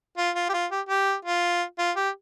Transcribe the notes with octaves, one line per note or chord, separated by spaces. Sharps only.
F4
F4
G4
F4
G4
G4
F4
F4
G4